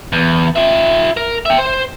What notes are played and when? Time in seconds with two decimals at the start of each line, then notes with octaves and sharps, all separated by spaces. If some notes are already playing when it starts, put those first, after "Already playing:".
0.12 E2
0.56 F4 E5
1.17 A#4
1.46 E5 G5
1.58 C5